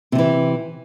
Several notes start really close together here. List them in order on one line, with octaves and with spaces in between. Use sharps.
C3 F3 E3